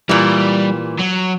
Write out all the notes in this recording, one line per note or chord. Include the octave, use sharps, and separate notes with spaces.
A#2 E3 G3
F#3